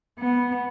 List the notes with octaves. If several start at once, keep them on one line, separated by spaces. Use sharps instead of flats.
B3